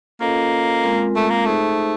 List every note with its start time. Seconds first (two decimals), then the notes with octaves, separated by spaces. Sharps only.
0.20 A#3 C#4 F4 A4 C5 D#5
0.83 G#3 C4 F4 A#4
1.15 A3
1.30 A#3
1.46 A3 D#4 G#4 C5